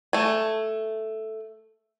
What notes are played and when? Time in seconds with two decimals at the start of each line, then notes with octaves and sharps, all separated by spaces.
0.13 A3 G#5